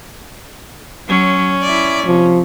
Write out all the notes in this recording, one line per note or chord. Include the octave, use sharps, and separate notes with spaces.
F#3 C#4
E4 D5
C3 F3